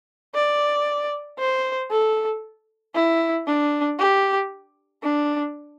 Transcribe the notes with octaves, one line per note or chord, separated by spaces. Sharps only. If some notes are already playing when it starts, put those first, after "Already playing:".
D5
C5
A4
E4
D4
G4
D4